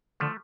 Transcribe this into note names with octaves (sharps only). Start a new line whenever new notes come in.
D3 F3 A3